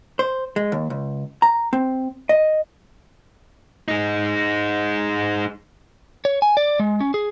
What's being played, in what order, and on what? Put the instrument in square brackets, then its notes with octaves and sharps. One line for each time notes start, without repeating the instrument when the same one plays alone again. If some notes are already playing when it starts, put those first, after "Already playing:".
[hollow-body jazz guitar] C5
G#3
D#2
C#2
A#5
C4
D#5
[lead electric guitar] G#3 D#4
[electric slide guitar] C#5
G#5
D5
G#3
C#4
G#4